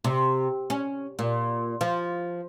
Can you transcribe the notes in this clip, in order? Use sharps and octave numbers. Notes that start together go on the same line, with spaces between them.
C3
C#4
A#2
F3